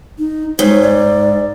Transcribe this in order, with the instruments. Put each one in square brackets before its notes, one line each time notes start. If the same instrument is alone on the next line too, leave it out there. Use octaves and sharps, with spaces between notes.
[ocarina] D#4
[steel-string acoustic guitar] G#2 [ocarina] C#5
[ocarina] D5